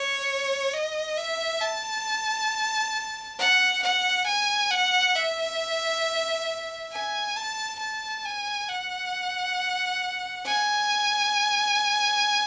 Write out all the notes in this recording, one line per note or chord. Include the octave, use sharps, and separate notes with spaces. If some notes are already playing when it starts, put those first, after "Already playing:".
Already playing: C#5
D#5
E5
A5
F#5
F#5
G#5
F#5
E5
G#5
A5
A5
G#5
F#5
G#5